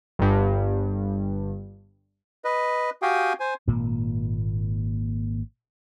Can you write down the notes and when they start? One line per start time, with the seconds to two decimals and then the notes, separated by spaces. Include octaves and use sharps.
0.19 G1 G2
2.45 B4 D#5
3.02 F#4 G4 F5 G5 G#5 D#6
3.40 C5 G#5
3.67 G#1 A#2 A#3